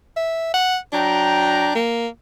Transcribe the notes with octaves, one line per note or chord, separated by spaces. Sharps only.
E5
F#5
F#3 D4 G5 A#5
A#3